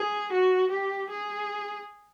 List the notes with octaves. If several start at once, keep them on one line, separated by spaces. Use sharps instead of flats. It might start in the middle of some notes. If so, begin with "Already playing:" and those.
Already playing: G#4
F#4
G4
G#4